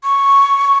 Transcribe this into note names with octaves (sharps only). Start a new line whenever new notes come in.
C#6